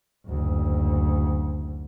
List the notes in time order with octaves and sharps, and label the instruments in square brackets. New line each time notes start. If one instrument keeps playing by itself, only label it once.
[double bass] F#1 D2